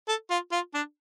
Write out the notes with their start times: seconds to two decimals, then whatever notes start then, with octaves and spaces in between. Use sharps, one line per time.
0.08 A4
0.30 F4
0.52 F4
0.74 D4